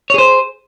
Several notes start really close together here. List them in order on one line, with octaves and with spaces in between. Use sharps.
C#5 G#4 C5